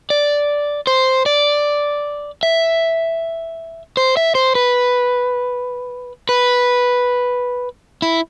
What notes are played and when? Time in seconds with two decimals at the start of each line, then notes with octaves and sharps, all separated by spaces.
0.10 D5
0.87 C5
1.26 D5
2.43 E5
3.97 C5
4.17 E5
4.35 C5
4.55 B4
6.29 B4
8.02 E4